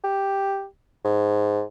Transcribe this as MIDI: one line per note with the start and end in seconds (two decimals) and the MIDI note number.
0.04 0.65 67
1.05 1.62 44